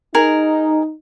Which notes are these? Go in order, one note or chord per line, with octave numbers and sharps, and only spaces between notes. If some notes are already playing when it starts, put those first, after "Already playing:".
D#4 G#4 A#4